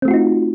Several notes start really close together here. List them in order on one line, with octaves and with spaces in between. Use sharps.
C4 A3 F4 F#4 D#4